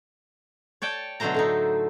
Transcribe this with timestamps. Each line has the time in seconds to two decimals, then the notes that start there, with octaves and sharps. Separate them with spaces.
0.82 C#5 D5 G5 A5
1.20 B2 D3 F#3 A3 C5 A#5
1.34 A2 D3 D#4